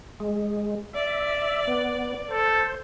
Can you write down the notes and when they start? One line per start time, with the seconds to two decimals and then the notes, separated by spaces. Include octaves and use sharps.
0.20 G#3
0.93 D5 E5
1.68 B3
2.31 A4 C5